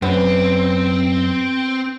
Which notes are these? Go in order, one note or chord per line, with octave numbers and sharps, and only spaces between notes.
F#2 B3 C4